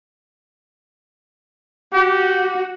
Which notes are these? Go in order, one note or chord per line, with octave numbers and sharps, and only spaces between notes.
F#4 G4